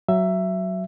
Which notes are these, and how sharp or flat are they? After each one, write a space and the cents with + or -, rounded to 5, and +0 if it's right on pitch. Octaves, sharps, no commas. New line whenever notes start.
F#3 +10 E5 +15